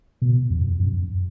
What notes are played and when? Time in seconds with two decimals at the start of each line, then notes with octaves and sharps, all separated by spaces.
0.22 B2
0.50 F2
0.80 F#2